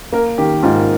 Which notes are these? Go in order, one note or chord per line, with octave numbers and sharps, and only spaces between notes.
A#3 A#4
D#3 G4
G#2 F4